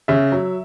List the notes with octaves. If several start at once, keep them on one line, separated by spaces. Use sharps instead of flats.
C#3 E5
F#3